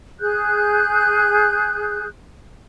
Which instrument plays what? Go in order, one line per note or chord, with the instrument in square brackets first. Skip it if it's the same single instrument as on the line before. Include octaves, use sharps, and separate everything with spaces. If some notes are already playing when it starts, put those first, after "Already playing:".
[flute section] G#4 F#6 G6